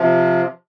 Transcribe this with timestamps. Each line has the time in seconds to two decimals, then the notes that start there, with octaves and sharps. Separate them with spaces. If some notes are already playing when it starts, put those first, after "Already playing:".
Already playing: C3 F3